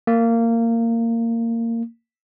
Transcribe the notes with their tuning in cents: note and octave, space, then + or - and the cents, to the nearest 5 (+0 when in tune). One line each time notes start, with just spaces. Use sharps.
A#3 -20